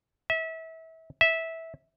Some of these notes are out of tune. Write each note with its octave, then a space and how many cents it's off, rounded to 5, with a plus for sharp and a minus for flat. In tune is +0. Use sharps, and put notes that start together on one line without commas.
E5 -30
E5 -15